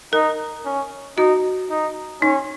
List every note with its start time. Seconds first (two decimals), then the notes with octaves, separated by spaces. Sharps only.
0.13 D#4 A#4
0.65 C#4
1.18 D#4 F#4
1.70 D#4
2.22 C#4 D#4